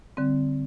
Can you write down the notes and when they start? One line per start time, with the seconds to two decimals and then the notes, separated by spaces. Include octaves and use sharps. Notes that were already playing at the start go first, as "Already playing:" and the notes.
0.17 D3 G3 C4